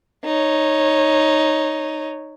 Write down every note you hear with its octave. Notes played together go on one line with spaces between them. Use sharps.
D#4 C#5